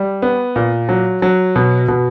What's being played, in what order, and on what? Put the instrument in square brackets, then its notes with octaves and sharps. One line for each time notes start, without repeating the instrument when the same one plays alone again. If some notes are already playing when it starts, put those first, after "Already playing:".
Already playing: [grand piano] G3
B3
A#2
F#3
F#3
B2
B2